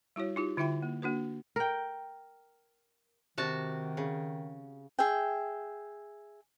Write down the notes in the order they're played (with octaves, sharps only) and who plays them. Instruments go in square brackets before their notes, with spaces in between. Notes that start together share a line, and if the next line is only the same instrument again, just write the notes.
[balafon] G3 E4 F#4 C#5
D#4 F4 G4
D3 E4 F4 E5 G5 B5
A#3
A#3 D4 F#4 B4
[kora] A#4 G5
[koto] C3 F#4 A5 [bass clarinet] D#3
[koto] C#3
[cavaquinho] G#4 E5 G5